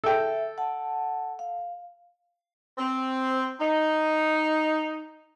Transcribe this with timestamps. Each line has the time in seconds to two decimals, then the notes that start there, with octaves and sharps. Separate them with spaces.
0.04 A4 E5 G5
0.58 F#5 A5
1.39 F5
2.79 C4
3.59 D#4